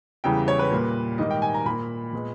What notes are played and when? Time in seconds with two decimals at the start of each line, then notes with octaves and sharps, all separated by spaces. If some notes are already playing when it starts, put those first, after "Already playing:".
0.24 E2 C#3 E3 G3 G5
0.48 C#5
0.59 B4
0.71 A#2 G3 A#3
1.18 G#2 D#3 G3 A#3 D#5
1.31 G5
1.42 G#5
1.54 A#5
1.66 A#2 A#3 B5
2.13 A#2 G#3 B3